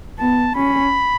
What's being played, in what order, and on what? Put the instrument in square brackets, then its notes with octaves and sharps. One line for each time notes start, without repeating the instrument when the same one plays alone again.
[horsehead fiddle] B3 [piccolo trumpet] A5
[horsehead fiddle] C#4 [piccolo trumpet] B5